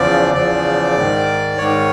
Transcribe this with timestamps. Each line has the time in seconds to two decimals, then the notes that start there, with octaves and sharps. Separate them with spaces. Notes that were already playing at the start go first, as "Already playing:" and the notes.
Already playing: E2 C#3 F3 D5
0.34 E2 C#3 F3 D5
0.96 G#2 D#3
1.58 G#2 D#3 C#5